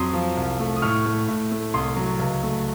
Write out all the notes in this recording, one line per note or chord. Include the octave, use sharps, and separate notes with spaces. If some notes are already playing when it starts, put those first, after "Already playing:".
Already playing: F2 F#3 C6 D#6
F3
C2
A3
D#6
A2 C#6 F6
A3
A2
A3
C2 C6 D#6
F#3
C#2
A3